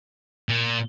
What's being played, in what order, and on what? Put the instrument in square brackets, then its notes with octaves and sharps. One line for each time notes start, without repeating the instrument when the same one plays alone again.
[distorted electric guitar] A#2